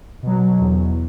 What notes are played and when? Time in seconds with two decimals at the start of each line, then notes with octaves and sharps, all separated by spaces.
0.23 B2 F#3
0.60 E2